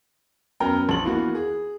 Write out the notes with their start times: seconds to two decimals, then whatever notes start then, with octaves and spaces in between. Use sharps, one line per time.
0.60 F#2 B3 A#4 G5 A#5
0.89 A#1 D4 F#7
1.05 E3 A#3 B3 F4 F#4
1.35 G#4